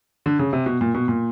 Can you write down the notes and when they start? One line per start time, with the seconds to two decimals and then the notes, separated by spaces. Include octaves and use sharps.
0.26 D3
0.39 C#3
0.53 C3
0.66 B2
0.81 A#2
0.95 B2
1.08 A#2